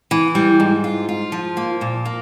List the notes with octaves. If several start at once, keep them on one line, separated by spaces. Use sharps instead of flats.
E3
G3
G#2
F4
F4
F3
A#3
A#2
A#3